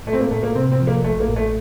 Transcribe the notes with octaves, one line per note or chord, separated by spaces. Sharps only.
A2 A3
C4
A#3
A2 A3
A#3
C3 C4
C4
F3
A#3
A1 A3
A#3
A2
A3